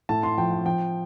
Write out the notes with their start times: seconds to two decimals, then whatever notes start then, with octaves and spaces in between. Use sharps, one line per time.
0.09 A2 A5
0.23 C6
0.38 F3 G5
0.51 G5
0.65 F3 G5